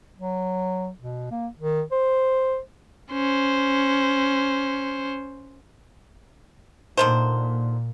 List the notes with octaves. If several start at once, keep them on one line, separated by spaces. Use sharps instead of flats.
F#3
B2
A#3
D#3
C5
C#4 C5
A#2 D3 D#3 C5